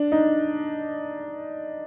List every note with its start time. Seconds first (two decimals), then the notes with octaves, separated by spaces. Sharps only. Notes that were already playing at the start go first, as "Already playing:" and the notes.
Already playing: D4
0.12 D#4